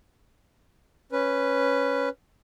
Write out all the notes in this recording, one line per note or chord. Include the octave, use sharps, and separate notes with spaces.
C#4 B4